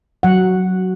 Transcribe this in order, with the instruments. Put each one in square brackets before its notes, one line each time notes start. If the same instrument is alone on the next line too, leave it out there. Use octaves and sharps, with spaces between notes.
[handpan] F#3 F#5